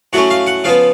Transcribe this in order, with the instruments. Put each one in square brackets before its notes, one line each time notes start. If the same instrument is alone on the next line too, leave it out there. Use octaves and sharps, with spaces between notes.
[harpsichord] A2 F#3 A3 C#4 F#5
F5
F#5
C#3 F3 B3 F5